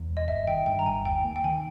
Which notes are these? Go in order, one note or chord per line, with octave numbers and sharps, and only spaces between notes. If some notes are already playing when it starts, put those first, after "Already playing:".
Already playing: E2
E1
D#5
G1 E5
D#3 G5
G2 G5
A#5
G1 G#5
D#2 G5
A#3
G5
D#3 G#5